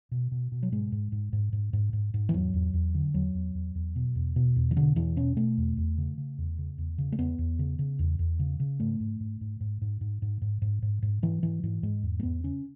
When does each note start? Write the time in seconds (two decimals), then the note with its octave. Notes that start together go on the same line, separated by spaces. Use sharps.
0.11 B2
0.32 B2
0.52 B2
0.63 F#3
0.72 G#2 G#3
0.92 G#2
1.12 G#2
1.33 G#2
1.53 G#2
1.73 G#2
1.93 G#2
2.14 G#2
2.29 E3
2.34 E2 F#3
2.53 E2
2.74 E2
2.95 D3
3.14 E2 F#3
3.34 E2
3.55 E2
3.75 E2
3.96 B2
4.15 E2
4.36 B2
4.56 E2
4.71 E3
4.76 B2 D3
4.96 E2 E3
5.16 B2 C#4
5.37 B2 A3
5.57 E2
5.77 E2
5.98 C#3
6.18 C#3
6.38 E2
6.58 C#3
6.78 E2
6.98 C#3
7.12 A3
7.18 E2 B3
7.39 E2
7.59 C#3
7.79 C#3
7.99 E2
8.19 E2
8.39 C#3
8.60 C#3
8.80 G#2 A3
9.00 G#2
9.20 G#2
9.41 G#2
9.60 G#2
9.81 G#2
10.01 G#2
10.22 G#2
10.42 G#2
10.62 G#2
10.82 G#2
11.02 G#2
11.22 G#2 E3
11.42 G#2 E3
11.63 G#2 E3
11.83 G#2 G#3
12.03 E2
12.20 A3
12.23 E2 B3
12.44 C#3 C#4